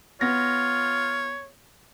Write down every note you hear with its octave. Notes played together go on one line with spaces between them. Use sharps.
B3 F4 C#5 A#6